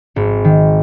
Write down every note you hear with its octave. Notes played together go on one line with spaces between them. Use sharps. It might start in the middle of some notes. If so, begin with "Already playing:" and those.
G#1
D#3